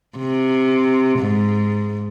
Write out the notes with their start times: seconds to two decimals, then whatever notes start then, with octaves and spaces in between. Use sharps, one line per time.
0.17 C3
1.19 G#2